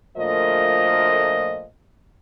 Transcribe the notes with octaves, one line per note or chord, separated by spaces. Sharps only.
D2 A#2 F3 A3 A#4 D#5